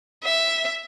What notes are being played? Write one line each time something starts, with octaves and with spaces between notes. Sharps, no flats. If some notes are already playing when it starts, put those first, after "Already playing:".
E5